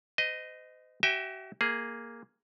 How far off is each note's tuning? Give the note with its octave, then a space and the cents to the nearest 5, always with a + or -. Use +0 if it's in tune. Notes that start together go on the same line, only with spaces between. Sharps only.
C5 -40 D#5 +0
F#4 +45 E5 +0 G5 +30
A#3 +0 G#4 +5